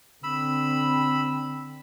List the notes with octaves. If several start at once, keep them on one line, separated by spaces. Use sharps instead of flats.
D3 C4 B5 E6